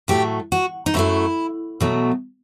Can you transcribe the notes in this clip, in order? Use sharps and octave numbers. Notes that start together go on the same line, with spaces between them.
A2 F#3 A3 G4
F#4
D#4
F#2 F#3 A3 E4
B2 F#3 A3